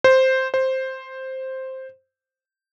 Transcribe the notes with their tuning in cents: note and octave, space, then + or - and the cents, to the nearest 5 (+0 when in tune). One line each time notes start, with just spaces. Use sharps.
C5 +0
C5 +5